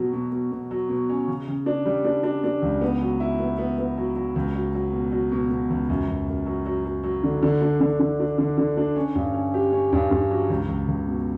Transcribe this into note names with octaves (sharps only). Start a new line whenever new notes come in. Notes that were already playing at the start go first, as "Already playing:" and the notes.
Already playing: B2 F#3
B2
B2
B2
F#3
B2
C#4
C#3
C#3
D4
G3
D4
D4
D4
C#2
B3
F#3
E4
B3
B3
B3
F#3
F#3
C#2
F#3
F#3
B2
F#3
B2
B2
C#2
F#2
F#2
F#2
F#3
F#3
F#3
F#3
D3
D3
D4
D3
D3
D4
D3
D3
D4
C#4
G2
C#4
G4
C#4
G2
G2
F#3
C#2
C#2
C#2
B2